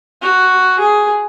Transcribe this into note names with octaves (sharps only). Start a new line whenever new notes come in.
F#4
G#4